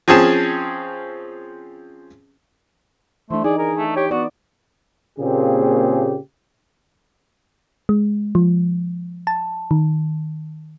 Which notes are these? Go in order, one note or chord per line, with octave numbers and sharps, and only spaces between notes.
F3 C4 C#4 G#4 A5
E3 A3 D4 C5
D#4 G#4 D5
G#4 A#4
A3
G4 C#5
B3 F#4 D5
A#2 C#3 A#3 C4 G4 G#4
G#3
F3
A5
D#3